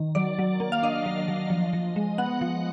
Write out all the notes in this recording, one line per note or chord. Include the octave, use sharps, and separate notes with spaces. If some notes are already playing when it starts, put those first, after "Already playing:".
Already playing: D#3
F#3 D5
F#3
A#3
F5
D4 D#5
F#3
F#3
F3
F3
G#3
B3 F#5
F3